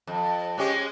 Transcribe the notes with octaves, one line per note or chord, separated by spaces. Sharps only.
F2
G#3 C#4 G4